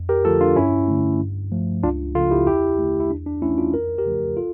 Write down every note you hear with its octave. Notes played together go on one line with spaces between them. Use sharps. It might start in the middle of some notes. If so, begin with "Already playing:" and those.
Already playing: F2
G4 A#4
D3 F3 A3 F4 A4
D4 F4
G2 C#4 E4
D3 A3
G2
F3 A3
C#2 D4 F4
C#3 F3 A3 F4 A4
E4 G4
E2 E4 G4
D3 A3
E4
E2 D4
D4
E3 A3 C#4 E4
D4 F4
F2 A#4
G4 A#4
C#3 F3 A3
F4 A4